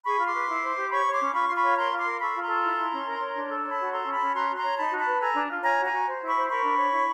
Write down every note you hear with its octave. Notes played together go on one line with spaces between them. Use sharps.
G#4 B5 C#6
F4
C6 D6
B4
E4
C5
G4
C#5 B5 C#6
C#5
C6 D6
C#4
F4 B5 C#6
F4 C6
B5 C#6
C#5
A#4 A#5 C6
F4
C6 D6
A#4
A4 B5 C#6
F4
A#5 C6
A4
E4
E4
C#4
A#4
C#5
D4
A4
C#5
A5 B5
F#4
A4 A#5 C6
C#4
A5 B5
C#4
F#4 A#5 C6
F#4
A#5 C6
C#5
D#4 A5 B5
F#4
A5 B5
B4
A4 G#5 A#5
D4
F4
C#5 G#5 A#5
F#4
G#5 A#5
F#4
C5
E4
B5 C#6
C5
A#4 B5 C#6
D4
C#5
E4